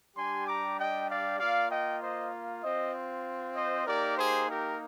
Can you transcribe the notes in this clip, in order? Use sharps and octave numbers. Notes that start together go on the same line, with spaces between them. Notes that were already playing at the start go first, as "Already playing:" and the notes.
G3 D4 G4 G#5 C6
A#5 D6
D#5 G5
D5 F5
A#3 F4 D5 F5
D#5 G5
C5 D#5
C4 F4 C5 D#5
C5 D#5
A#3 D#4 G4 A#4 D5
G#4 C5
G4 A#4